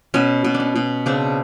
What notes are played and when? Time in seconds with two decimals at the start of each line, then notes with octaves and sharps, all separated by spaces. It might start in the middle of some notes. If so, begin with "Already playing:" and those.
0.14 B2 C#4
0.44 B2
0.54 D4
0.60 C#4
0.76 B2
1.06 C#3 C4 D4